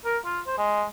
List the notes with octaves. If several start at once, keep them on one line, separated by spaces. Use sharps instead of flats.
A#4
F4
C5
G#3